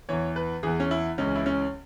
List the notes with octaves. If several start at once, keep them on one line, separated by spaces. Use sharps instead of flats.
E2 E3 C#5
B4
E2 E3 G#4
C#4
E4
C#2 C#3 E3 C#4
E4
C#4